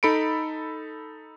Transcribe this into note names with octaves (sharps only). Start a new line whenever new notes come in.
D#4 A4 B5 C#7 D7